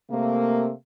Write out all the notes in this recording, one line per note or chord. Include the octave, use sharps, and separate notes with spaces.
C3 A3 A#3